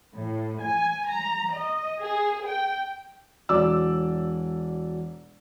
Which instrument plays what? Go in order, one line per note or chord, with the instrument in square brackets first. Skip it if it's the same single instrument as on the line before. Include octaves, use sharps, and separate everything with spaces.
[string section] A2
G#5
A#5
D#5
G#4
G5
[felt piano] E1 F#3 D5 D6 E6